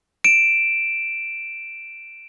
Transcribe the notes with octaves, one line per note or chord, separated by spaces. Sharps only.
D7 E7